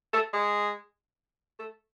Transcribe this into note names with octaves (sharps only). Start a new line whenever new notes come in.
A3
G#3
A3